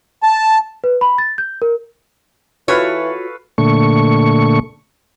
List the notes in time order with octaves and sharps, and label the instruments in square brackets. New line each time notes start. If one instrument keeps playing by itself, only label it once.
[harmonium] A5
[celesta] B4
B5
A6
G6
A#4
[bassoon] E3 [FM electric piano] F4 F#4 [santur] A4 B4 F5 [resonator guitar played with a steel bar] C#5
[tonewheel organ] A#2 D3 A3 C#6